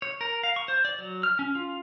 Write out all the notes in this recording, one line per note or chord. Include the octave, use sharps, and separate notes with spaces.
C#5
A#4
F5
C#6
C5
D5
F#3
F6
C#4
F4